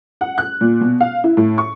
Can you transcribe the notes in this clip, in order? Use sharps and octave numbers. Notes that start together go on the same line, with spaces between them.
F#5
F#6
A#2
B2
F5
E4
A2
C#6